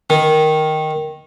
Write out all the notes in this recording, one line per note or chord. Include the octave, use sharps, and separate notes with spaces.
D#3